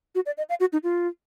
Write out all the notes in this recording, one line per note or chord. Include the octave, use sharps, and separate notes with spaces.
F#4
D5
D#5
F5
F#4
D#4
F4